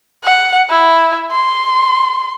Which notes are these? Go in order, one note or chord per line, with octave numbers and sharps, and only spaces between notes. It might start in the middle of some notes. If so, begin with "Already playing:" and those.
F#5
E4
C6